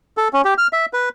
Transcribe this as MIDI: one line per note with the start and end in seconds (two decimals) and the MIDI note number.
0.17 0.28 69
0.33 0.42 61
0.45 0.54 67
0.58 0.67 89
0.73 0.86 76
0.93 1.09 71